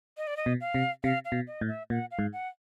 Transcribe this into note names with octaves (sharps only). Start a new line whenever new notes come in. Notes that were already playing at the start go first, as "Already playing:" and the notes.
D#5
D5
D#5
B2
F5
C3
C3 F5
F5
B2
D#5
A2
E5
A#2 F#5
F5
G#2
F#5